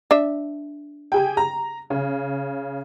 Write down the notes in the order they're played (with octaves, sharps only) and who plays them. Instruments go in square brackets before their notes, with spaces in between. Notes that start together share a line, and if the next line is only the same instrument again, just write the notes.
[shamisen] D4 E5
[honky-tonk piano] G4 G#4 G5
A#5
C#3